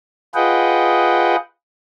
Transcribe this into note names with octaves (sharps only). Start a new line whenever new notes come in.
F4 G#4 B4 D#5 F#5 G5